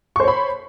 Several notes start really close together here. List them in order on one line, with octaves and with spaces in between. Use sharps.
C#6 C5 C#5 B5